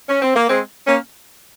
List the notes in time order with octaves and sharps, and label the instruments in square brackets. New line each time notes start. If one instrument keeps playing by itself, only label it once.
[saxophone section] C#4
C4
A#3
G#3 C4
A#3 C#4